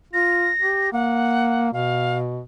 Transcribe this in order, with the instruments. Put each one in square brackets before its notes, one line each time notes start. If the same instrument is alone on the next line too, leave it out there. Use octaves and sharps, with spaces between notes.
[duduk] F4 [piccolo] A#6
[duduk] G4
[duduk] A#3 [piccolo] F#5
[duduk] B2 [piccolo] F5